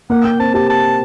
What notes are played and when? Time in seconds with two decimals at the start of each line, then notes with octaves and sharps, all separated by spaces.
0.10 A#3 F#5
0.25 A#3 G5
0.39 C4 A5
0.54 G4 A5
0.69 A5